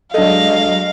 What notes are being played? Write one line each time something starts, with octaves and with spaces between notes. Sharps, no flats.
F#3 G#3 D4 A4 D#5 F5